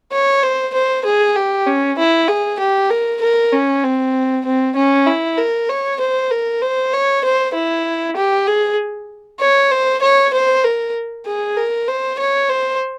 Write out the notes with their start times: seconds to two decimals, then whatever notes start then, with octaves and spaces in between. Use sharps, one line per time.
0.12 C#5
0.43 C5
0.74 C5
1.05 G#4
1.36 G4
1.66 C#4
1.98 E4
2.28 G#4
2.59 G4
2.90 A#4
3.21 A#4
3.53 C#4
3.83 C4
4.45 C4
4.76 C#4
5.07 E4
5.38 A#4
5.69 C#5
6.00 C5
6.31 A#4
6.62 C5
6.93 C#5
7.24 C5
7.54 E4
8.16 G4
8.47 G#4
9.40 C#5
9.71 C5
10.02 C#5
10.33 C5
10.64 A#4
11.26 G#4
11.57 A#4
11.88 C5
12.19 C#5
12.50 C5